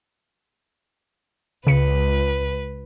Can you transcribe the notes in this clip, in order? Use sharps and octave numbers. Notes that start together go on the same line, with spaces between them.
C#2 C#3 B4 C#7